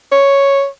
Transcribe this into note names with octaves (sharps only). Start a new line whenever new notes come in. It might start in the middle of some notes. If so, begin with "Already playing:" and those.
C#5